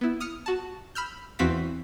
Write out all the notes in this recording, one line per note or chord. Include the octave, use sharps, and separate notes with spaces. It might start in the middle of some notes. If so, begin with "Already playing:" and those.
B3 E4
D#6 F6 C#7
F#4 A5
B5 E6 F6 G6
E2 E3 C4 F#4 F5 B6